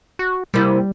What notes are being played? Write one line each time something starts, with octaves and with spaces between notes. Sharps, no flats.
F#4
C3 G3 A#3 E4